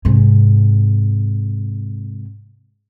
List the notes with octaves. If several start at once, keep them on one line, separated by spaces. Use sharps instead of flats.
G#2 C3